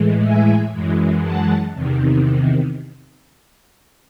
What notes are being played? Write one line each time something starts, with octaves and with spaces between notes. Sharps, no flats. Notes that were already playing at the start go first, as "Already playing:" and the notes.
Already playing: A2 E3 G#3
E5 G#5
F#2 E3 G#3
F#5 A5
E2 C3 D#3